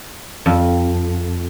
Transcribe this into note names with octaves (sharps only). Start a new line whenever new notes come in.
F2